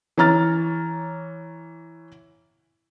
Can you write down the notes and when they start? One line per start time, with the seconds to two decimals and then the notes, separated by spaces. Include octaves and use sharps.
0.17 E3 C#5 A#5 F6 A6